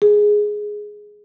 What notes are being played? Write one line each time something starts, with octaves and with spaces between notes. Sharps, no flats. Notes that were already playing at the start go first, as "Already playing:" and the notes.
G#4